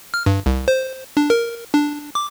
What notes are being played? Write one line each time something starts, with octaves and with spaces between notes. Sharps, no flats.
F6
G2
C2
C5
D4
A#4
D4
D6